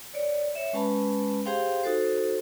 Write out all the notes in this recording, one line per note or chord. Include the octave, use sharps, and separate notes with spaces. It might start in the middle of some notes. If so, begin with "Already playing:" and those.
C#5 D5
C#5 E5
G#3 C#4 B4 A5 B5
G4 G#4 C5 F5 G5 C6
D#4 F#4 A4 C5